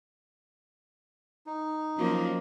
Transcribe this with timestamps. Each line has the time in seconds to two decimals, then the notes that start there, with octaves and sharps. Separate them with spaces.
1.47 D#4
1.96 F#2 F3 A#3